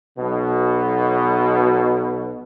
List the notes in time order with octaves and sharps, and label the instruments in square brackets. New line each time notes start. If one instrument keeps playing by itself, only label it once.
[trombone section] B1 B2